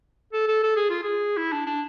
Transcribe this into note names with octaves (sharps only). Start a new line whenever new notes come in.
A4
A4
A4
G#4
F4
G#4
E4
D4
D4